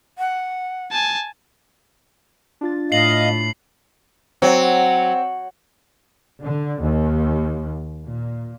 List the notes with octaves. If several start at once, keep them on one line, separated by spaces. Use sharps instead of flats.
F#5
G#5 A5
D4 F4 A6
A2 D#5 F5 C7 F#7
F#3 C4
D3
D#2
A#2